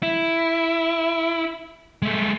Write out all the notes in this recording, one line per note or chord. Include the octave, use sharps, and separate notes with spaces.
E4
G#3 A3